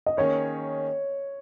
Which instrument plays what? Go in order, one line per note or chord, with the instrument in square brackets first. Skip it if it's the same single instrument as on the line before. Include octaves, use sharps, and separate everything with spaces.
[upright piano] D#5
[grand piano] D#3 A#3 C#4 G#4 [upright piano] C#5